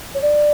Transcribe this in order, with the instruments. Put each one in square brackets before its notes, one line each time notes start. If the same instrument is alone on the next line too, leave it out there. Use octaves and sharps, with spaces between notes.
[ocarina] C#5
D5